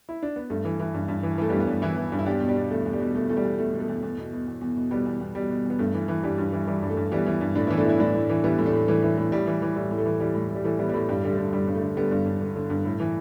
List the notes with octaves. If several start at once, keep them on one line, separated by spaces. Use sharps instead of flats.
E4
D4
B3
G2 A3
E3
E3
G2
G2
E3
E3 A3
G3 B3
G2
G3 B3
G2
E3 B3 E4
E3
G2
E4
E2 D4 G4
B2
G3
B2
E2 A3
E2
G3
B2
B2 A3
E2 A3
G3
E2
B2 A3
B2
A3
E2
E2
B2
B2
E2
E2
B2
B2 G3 B3
E2
E2
B2 G3
B2
E2
B3
G2 A3
E3
E3
G2 G3
G2
E3
E3 G3
G2
A3
G2
E3 G3 B3
E3
G2
A2 A3 D4
B3 E4
E3
A3 D4
E3 B3 E4
A2 A3 D4
A2
E3
E3 G3 B3
A2
A3 D4
A2
E3 A3
E3
A2
A2 G3
E3
E3
A2 G3
A2
A3
E3
E3 G3
A2
A2
G3
E3 A3
E3 G3 B3
G3
A2 A3
G2 G3
D3 G3
A3
D3
G2 G3
G2
A3
D3
D3 G3 B3
G2
G2
D3
D3
G2
A2
E3